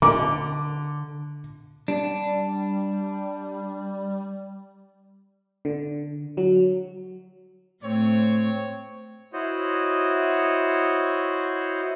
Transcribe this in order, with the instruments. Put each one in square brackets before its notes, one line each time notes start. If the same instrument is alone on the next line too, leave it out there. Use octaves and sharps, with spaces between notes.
[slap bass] D3 [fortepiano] D6
[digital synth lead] G3 [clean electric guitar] D4
[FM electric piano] D3
F#3
[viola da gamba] A2 [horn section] C4 C#5
[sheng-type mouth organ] E4 F#4 C5 C#5 D#5